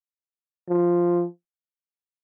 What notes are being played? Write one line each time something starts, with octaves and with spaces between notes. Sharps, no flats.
F3